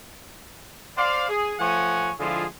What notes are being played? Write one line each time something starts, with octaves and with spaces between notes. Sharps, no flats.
C5 D5 F5
G#4
F3 A3 C#5 F#5 G#5
D3 F3 G#3 E4 F4 G#4